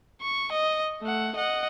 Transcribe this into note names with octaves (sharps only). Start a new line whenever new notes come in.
C#6
D#5
A3 F#5
D#5 F#5